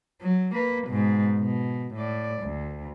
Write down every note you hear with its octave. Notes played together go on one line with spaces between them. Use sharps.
F#3
A#3 B4
G#2 B2
B2
A2 D5
D2